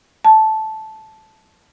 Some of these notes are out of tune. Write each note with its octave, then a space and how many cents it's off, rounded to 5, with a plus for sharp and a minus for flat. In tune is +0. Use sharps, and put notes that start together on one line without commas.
A5 -10